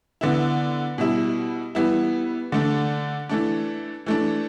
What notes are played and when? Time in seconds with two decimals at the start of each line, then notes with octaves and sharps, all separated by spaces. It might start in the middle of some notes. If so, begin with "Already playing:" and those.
0.21 D3 B3 E4
0.98 B2 G3 E4
1.75 E3 G3 B3 E4
2.52 D3 A3 D4
3.29 E3 A3 D4
4.06 E3 A3 D4